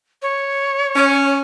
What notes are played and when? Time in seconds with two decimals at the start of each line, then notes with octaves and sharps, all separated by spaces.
0.22 C#5
0.96 C#4